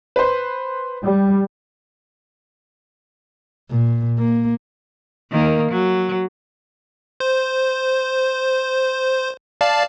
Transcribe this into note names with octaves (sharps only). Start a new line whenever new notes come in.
B4 C5
G3
A#2
A#3
D#3 A#3
F#3
C5
D5 F5 A5